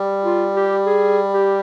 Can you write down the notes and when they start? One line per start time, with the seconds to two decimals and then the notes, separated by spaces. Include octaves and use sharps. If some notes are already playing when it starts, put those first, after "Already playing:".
Already playing: G3
0.24 F4
0.56 G4
0.86 G#4
1.34 G4